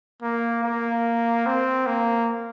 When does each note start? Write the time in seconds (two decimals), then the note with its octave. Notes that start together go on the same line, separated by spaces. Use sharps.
0.22 A#3
0.63 A#3
1.46 C4
1.87 A#3